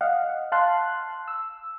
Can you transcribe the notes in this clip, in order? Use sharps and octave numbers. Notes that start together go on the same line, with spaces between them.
D#5 F5 F#5
F5 A5 C6 F#6
E6